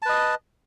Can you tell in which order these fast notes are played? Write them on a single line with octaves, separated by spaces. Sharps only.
A5 B4 D#5